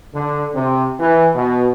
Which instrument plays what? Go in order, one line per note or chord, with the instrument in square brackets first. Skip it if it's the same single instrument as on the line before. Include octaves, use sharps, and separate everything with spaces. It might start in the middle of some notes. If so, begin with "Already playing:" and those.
[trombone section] D3
C3
E3
B2